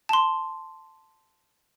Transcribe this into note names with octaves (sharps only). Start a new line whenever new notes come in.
A5 C6